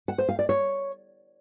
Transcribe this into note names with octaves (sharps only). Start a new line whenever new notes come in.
F#5
C5
F5
D5
C#5